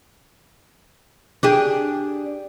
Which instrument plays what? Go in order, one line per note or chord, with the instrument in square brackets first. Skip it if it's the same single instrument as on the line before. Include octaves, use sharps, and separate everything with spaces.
[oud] D4 G4 G#4